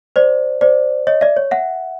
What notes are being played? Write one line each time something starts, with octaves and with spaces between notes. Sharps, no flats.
C5 D5
C5 D5
C#5 D#5
D5 E5
C#5
E5 F#5